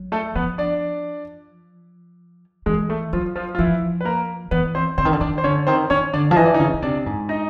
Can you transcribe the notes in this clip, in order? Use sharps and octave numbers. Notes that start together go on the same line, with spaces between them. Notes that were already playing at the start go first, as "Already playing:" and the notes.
Already playing: F#3
A3 A4
F3 B3 B4
D4 D5
E3 G#3 G#4
A3 A4
F3 F#3 F4
F3 F4
F4
E3 F3 E4
B4
A#3 A#4
E3 B3 B4
C4 C5
D3 C4 C5
D#3
D3
D#3 D4 D5
C5
D3 C#4 C#5
D#3 C4 C5
D#3 C#4 C#5
D3 D4 D5
F3
E3 D#5
D5
D#4 D#5
C#3
C#3
C3 D4 D5
G#2
D#4 D#5